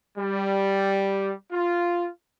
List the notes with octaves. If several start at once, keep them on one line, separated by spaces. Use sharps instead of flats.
G3
F4